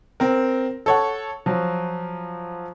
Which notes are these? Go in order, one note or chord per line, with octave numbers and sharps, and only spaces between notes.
C4 A#4
A4 C#5 F#5
F3 F#3